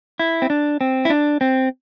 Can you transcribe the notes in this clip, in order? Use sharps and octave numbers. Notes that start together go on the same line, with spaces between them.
E4
C4
D4
C4
E4
D4
C4